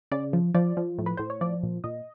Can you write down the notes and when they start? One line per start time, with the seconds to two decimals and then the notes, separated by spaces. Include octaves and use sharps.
0.11 C#3 D5
0.33 F3
0.54 F3 D5
0.77 F3
0.98 A2
1.06 B4
1.17 A2 C5
1.30 C#5
1.41 F3 D5
1.63 A#2
1.84 A#2 D#5